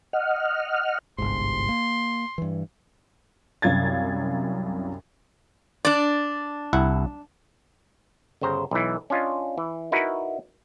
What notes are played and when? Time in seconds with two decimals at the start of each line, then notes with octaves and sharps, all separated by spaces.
0.13 D#5 F#5 F6
1.18 G1 C2 G#2 C6
1.69 A#3
2.38 G2 E3
3.62 C2 F#2 F5 G#6 A6
5.85 D4 D5
6.73 C2 E4 F#5
8.41 G1 C#3 C5 A#5
8.71 B1 E3
9.10 C#4 D4 F4 D#5
9.58 E3
9.92 D#4 E4 F#4 A#4 B4